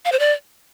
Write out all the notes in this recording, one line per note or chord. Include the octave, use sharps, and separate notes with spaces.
F5
C5
D5